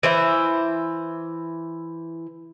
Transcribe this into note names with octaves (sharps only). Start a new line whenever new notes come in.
E3 C5 E5